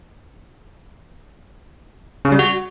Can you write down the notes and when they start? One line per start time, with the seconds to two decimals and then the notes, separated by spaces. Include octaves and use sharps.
2.25 C#3
2.32 G3
2.39 F#4